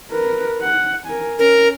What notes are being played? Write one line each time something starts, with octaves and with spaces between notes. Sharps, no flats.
A#4 B4
F#5
A#4 G#5
C#4 A#4